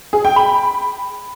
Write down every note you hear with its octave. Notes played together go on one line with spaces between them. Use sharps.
G#4
G5
B5